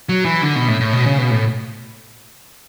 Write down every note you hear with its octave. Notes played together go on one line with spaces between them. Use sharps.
F#3
E3
D3
B2
A2
A2
B2
C#3
B2
A2